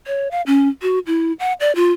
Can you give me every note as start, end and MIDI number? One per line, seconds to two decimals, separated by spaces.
0.07 0.30 73
0.31 0.42 77
0.47 0.69 61
0.82 0.99 66
1.07 1.33 64
1.40 1.53 78
1.60 1.74 74
1.75 1.92 65